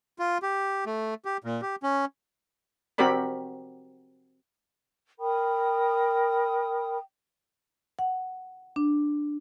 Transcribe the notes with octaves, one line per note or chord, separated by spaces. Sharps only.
F4
G4
A3
G4
A#2
G4
C#4
C4 F#4 G4 A#4 D5 B5
A#4 G5 B5 D#6
F#5
D4